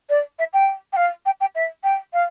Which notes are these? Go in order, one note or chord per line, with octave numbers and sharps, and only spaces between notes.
D5
E5
G5
G5
F5
G5
G5
E5
G5
F5